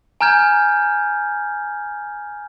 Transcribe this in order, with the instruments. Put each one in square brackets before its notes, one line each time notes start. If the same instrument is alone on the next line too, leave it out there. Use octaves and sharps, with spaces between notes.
[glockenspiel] G#5 A#5 F6 G6 G#6